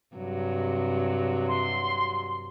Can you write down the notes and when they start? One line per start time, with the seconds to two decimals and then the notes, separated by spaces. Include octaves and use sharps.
0.16 G2 C3 F#3
1.48 C6